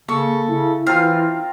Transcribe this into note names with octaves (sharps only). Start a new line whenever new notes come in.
C#3 A#3 A4 C#6
C#3 E4
E3 C4 F4 A#4 F5